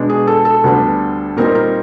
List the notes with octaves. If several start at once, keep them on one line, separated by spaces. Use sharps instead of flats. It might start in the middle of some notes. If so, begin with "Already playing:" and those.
Already playing: B2 G#3 B3 D4
G#4
A4
A4
D2 D3 G3 B3 D4
A#2 G3 C4 D#4 A#4
A#4